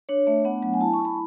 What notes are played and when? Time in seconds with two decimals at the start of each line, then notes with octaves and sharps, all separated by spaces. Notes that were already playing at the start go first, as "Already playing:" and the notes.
0.09 D4 C#5
0.27 A3 E5
0.45 B3 F#5
0.62 F#3 F#5
0.74 G#5
0.81 E4 A5
0.94 C#6
0.99 E4
1.05 B5